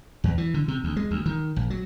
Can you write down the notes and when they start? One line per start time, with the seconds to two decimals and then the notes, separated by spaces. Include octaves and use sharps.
0.24 E2
0.38 E3
0.54 D3
0.68 C3
0.84 D2
0.96 G#3
1.11 D2
1.26 D#3
1.56 A#1
1.70 F#3